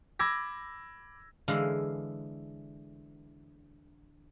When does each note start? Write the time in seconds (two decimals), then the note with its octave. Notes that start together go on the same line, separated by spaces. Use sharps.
0.19 B5 D6 E6 G#6 A#6
1.48 D3 E3 G#3 F5